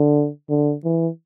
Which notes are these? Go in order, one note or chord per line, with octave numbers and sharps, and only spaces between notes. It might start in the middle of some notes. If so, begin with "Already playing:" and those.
Already playing: D3
D3
E3